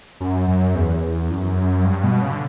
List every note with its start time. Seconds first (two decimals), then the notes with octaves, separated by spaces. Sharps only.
0.20 F#2
0.48 F#2
0.75 E2
1.30 F#2
1.85 G2
2.04 B2
2.22 C#3
2.31 D3